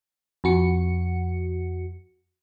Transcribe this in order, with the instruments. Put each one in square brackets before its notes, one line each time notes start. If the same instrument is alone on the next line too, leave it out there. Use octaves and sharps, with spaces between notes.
[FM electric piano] F2 F#4 C#7